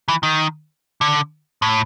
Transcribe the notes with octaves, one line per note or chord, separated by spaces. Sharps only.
E3
D#3
D3
A2